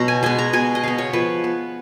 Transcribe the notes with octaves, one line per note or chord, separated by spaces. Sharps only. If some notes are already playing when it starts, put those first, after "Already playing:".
Already playing: B2 F#3 A#5
G#5
G#3 B3 G#5
A#5
B2 G#5
D#5
G#3 B3 F5
C#5
F3 B4
B3